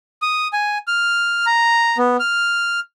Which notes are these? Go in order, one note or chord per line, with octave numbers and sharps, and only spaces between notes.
D#6
G#5
F6
A#5
B3
F6